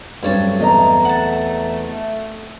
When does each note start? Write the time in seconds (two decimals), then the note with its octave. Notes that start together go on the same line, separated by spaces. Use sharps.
0.23 G2 F#3 A3 C4 C#4 C#5 A5
0.59 E2 D#5 A#5
1.05 F#5 A5